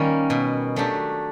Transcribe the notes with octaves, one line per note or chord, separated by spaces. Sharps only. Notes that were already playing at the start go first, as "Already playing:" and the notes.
Already playing: D#3 G3 A#3 C#4
B2
F#3 A3 D4 G4